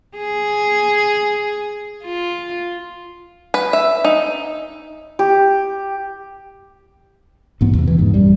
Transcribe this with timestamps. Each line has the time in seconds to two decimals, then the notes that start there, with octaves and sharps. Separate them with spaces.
0.17 G#4
2.04 F4
3.54 B4
3.73 E5
4.04 D#4
5.19 G4
7.61 A1 G#2 B3
7.75 E2 C3
7.87 E3
7.99 G#2
8.14 A1 F#2 G3